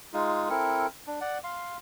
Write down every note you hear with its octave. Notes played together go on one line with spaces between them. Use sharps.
G#3 D#4 F4
C4 E4 A4 A#4
D4
D5 F#5
F5 C6